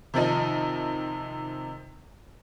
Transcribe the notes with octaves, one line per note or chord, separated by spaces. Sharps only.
C3 D#3 F3 D#4